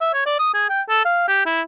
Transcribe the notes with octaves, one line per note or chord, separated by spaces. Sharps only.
E5
C#5
D5
D#6
G#4
G5
A4
F5
G4
E4